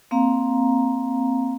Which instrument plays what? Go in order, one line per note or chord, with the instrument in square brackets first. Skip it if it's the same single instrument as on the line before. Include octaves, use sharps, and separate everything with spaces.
[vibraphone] A#3 C4 F5 A#5